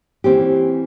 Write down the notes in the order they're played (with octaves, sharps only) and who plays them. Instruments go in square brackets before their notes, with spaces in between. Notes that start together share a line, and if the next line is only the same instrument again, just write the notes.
[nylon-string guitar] E3 C4 C#4 G4